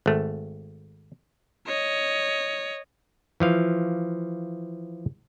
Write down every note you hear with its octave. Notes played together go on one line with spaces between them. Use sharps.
G#1 A3
C#5 D#5
E3 F3 F5